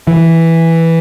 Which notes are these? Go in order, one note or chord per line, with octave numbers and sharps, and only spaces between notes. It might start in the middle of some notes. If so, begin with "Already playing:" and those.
E3